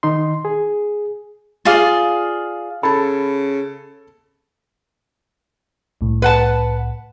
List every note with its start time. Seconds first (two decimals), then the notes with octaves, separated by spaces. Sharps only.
0.03 D#3 D#4 C6
0.45 G#4
1.65 F4 G#4 D5 F5
2.83 C#3 A4 A5 B5
6.01 C2 A2
6.22 B4 F#5 A5